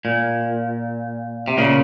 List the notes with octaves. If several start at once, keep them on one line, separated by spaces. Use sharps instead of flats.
A#2
C3
A#2 C#3